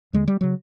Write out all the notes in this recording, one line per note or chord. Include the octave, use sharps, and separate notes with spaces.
D#2 D3 G#3
G3
C#3 F#3